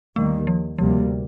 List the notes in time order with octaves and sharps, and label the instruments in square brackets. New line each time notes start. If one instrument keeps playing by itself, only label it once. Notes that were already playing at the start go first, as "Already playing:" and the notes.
[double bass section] D#2 D#3 G3 A#3 [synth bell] A3
[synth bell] F3
[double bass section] D2 C3 G3 A#3 [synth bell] F3